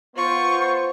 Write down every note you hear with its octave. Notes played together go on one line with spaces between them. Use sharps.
B3 F4 C5 C#6